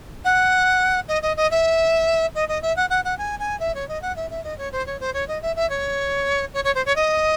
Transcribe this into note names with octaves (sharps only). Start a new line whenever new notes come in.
F#5
D#5
D#5
D#5
E5
D#5
D#5
E5
F#5
F#5
F#5
G#5
G#5
E5
C#5
D#5
F#5
E5
E5
D#5
C#5
C5
C#5
C5
C#5
D#5
E5
E5
C#5
C#5
C#5
C5
C#5
D#5